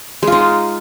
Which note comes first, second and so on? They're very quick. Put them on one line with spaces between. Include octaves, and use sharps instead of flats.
G#3 F4 D#4